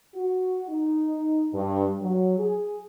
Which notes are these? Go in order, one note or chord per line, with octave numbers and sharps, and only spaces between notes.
F#4
D#4
G2
F#3
G#4